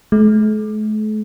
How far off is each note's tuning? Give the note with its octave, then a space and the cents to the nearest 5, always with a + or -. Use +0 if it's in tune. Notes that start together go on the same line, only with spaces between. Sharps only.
A3 -45